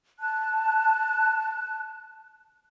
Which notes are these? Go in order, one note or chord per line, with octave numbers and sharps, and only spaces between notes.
A5 F#6